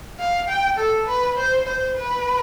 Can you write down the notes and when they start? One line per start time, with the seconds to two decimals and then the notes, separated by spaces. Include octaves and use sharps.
0.19 F5
0.49 G5
0.78 A4
1.07 B4
1.37 C5
1.67 C5
1.96 B4